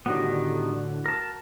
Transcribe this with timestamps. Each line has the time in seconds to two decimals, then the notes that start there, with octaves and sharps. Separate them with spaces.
0.06 A2 D3 D#3 G3 B3 F#4
1.06 A#4 A5